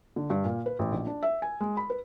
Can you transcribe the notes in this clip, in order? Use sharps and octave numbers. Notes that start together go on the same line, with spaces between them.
D3
G2
A#2
B4
A1
A#1
D4
E5
G#5
G#3
B5
B4